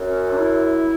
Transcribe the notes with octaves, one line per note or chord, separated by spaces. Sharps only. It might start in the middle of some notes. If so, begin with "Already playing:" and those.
Already playing: F#2
C#4
C#4
D4
E4